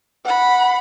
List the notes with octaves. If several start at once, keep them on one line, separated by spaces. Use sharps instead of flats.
F#5 B5